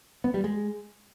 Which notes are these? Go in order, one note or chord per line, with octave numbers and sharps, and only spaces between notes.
B3
G3
G#3